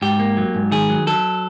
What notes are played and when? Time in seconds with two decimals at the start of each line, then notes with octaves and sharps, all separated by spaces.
0.02 G#2 G4
0.19 A#3
0.37 F#3
0.55 G#2
0.72 D#3 G#4
0.89 F#3
1.07 F#3 A4